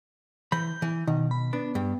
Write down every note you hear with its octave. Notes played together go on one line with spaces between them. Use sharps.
E3 B5 G6
E3
B2 D#3
B5
B3 D4
G2